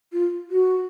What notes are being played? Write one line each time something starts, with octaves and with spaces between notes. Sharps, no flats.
F4
F#4